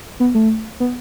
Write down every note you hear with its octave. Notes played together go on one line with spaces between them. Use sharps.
B3
A3
B3